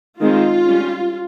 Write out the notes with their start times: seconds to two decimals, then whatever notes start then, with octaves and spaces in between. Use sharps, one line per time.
0.20 D#3 G#3 C4 F4
0.66 G3 C#4